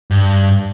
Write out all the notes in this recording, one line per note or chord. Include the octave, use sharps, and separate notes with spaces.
G2